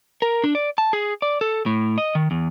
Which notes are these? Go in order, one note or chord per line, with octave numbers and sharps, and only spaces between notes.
A#4
D4
D5
A5
G#4
D5
A4
A2
D#5
D#3
E2